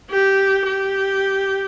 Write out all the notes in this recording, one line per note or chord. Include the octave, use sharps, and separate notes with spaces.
G4
G4